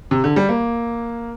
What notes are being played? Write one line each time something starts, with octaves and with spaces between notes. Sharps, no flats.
C3
D3
G3
A#3